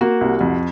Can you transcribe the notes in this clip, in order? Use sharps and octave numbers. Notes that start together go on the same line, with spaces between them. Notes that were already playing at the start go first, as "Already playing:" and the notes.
A#3 F#4
C2
F2